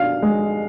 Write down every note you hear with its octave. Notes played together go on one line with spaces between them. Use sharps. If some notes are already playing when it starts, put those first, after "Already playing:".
Already playing: B2 D4 F5
G#3